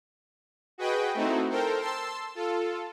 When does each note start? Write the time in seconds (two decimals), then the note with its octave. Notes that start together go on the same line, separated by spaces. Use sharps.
0.78 F#4 G#4 B4 D#5 G5
1.14 A3 C4 D#4 E4 F#4
1.49 A4 A#4 C5 G5
1.80 A5 C6 E6
2.35 F4 A4